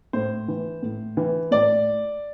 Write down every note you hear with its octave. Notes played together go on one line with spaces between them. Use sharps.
A2 C5
E3
A2
E3
A2 D5